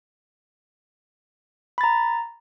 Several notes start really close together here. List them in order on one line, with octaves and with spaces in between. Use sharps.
B5 A6 A#5